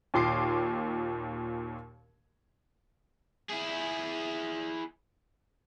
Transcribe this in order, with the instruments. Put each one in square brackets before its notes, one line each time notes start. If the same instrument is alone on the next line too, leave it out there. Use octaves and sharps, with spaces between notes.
[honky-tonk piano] D#2 A#2 C6 D6 C7
[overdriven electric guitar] E4 G#4